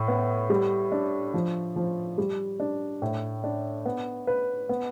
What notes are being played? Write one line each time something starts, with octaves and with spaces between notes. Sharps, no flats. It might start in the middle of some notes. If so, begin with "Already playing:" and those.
Already playing: A2
B3
G3
D4
F3
F3
G3
D4
A2
D4
B3
B4
B3